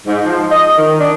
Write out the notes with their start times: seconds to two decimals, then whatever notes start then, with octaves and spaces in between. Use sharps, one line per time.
0.07 G#2
0.24 F3
0.50 D#5
0.77 D#3
0.99 D4